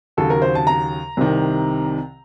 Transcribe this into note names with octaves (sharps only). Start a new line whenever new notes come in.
D#2 C#3 F#3 A4
A#4
C5
A5
A#5
C2 C3 D#3